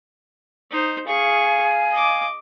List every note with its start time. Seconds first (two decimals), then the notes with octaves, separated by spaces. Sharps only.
0.71 D#4 C5
1.07 G#4 F5 G#5 C#6
1.92 D#5 D6